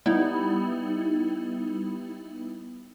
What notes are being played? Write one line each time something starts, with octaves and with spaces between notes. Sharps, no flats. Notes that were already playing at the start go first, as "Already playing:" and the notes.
G3 B3 D#4 E4